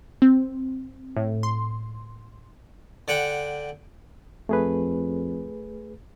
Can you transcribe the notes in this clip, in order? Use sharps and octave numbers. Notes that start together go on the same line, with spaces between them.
C4
A2
C6
D3 F#5 G5
F2 A3 G#4 B4